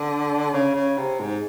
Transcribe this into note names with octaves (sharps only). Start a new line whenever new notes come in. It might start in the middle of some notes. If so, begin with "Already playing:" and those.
Already playing: D3
C#3
C#3
C3
G#2